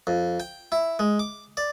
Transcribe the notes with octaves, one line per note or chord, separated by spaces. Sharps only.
F2
G5
E4
G#3
D6
D5